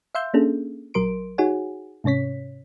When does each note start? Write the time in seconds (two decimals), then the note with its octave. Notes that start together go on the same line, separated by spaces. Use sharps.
0.15 E5 F5 C6 E6 G6
0.34 A#3 C#4 D4 G#4 A4
0.94 A#1 F#3 A#4 C6 D7
1.38 D#4 F#4 G#4 C#5 F#5 G#5
2.04 G#2 C3 C#4 C#5 B6